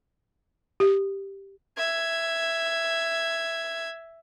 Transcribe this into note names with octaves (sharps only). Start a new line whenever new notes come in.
G4
E5 G#6